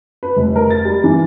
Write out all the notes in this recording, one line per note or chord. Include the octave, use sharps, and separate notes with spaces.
B4
F1
A#4
A6
G3
E3